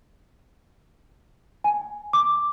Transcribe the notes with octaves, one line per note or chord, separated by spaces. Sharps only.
G#5
D6